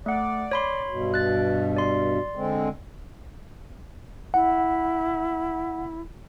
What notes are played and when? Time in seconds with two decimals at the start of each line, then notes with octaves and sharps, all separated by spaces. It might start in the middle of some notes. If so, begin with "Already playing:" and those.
0.06 A3 D5 F#5
0.51 C#5 B5 C6
0.89 G2 B2
1.14 F#6 A6
1.77 D5 C6
2.35 D3 G#3 C4
4.34 E4 F#5